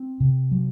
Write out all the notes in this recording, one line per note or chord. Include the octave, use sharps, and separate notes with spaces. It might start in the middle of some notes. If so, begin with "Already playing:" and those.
Already playing: C4
C3
F#3